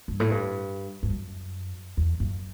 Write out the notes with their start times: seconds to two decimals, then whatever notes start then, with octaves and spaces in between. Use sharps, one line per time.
0.08 G2
0.20 A2
0.31 G2
1.03 G2
1.10 F#2
1.97 E2
2.20 F#2